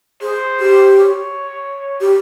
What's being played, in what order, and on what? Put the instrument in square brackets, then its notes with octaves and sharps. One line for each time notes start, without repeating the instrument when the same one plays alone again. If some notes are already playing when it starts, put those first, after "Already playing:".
[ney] G#4 [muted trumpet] C5
[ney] G4
[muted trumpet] C#5
[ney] G4